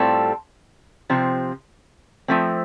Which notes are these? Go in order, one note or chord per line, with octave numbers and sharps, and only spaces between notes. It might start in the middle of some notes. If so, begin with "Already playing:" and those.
Already playing: A2 G3 C4 F4 A4
C3 F3 C4
F3 A3 C4